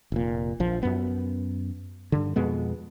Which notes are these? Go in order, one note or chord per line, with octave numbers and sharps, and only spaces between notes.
F1 A#2
A#1 F3
F#2 B3
G2 D3
F2 B2 G#3 B3